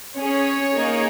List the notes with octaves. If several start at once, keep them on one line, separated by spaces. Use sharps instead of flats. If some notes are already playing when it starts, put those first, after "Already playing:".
C#4 G#4 C#5
A#3 D#4 G#4